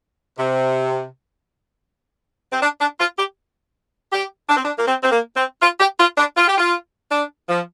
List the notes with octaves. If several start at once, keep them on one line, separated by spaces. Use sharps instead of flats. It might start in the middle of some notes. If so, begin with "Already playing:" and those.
C3
C4
D4
D4
F4
G4
G4
D4
C4
D4
A#3
C4
C4
A#3
C4
F4
G4
F4
D4
F4
G4
F4
D4
F3